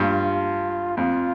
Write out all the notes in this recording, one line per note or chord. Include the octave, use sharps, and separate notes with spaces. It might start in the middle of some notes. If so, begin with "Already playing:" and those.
Already playing: G2 F4
F2 F4